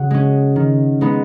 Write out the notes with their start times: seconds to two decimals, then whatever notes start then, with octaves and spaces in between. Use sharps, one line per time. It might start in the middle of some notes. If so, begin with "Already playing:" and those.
Already playing: C#3 F#4 F#5
0.10 G#3 C#4
0.56 D#3
1.01 G#3 B3 D#4